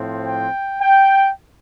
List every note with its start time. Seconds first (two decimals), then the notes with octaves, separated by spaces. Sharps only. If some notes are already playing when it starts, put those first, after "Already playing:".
Already playing: A2 F3 C4
0.27 G5
0.81 G5